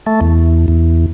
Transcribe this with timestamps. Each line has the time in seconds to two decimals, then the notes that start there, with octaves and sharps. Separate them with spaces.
0.06 A3
0.21 E2
0.68 E2